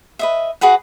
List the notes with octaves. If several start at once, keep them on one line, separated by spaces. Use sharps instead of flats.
B4 D#5 E5
F#4 G#4 B4 F#5